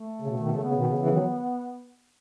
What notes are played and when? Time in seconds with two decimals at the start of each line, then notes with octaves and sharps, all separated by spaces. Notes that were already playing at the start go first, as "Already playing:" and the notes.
Already playing: A3
0.22 C#3
0.27 B2
0.39 B2 D#3
0.51 C#3
0.57 A3
0.63 C#3 B3
0.74 B2 D#3
0.86 C#3
0.98 C#3 E3
1.11 D#3 F#3